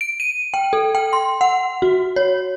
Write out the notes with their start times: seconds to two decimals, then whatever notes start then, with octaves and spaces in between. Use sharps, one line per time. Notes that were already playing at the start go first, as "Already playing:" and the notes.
0.01 D7
0.20 D#7
0.54 G5
0.73 A4
0.95 G5
1.13 C6
1.41 F#5
1.82 F#4
2.16 C#5